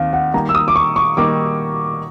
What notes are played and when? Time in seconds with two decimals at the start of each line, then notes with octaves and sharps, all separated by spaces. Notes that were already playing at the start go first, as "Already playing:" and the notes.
Already playing: D#2 D#3 C4 F5
0.13 F#5
0.34 D#3 G3 A#3 D#4 A#5
0.49 E6
0.55 D#6
0.68 D6
0.76 C#6
0.96 C#6
1.17 D#3 G3 A#3 D#4 D6